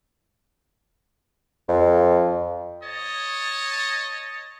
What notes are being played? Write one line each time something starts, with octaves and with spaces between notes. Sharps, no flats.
F2
C#5 D#5 A5